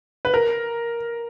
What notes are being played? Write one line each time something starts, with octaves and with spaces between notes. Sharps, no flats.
B4
A#4